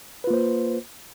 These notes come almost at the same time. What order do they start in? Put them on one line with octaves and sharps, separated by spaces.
B4 F4 A#3 C5